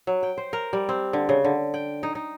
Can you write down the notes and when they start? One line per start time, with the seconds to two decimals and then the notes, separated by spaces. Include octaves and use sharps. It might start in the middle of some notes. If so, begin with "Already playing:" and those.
0.07 F#3
0.23 G5
0.38 C5
0.53 A#4
0.73 G3
0.89 C4
1.13 D3
1.29 C#3
1.44 D3
1.74 G5
2.03 D#4
2.15 D#4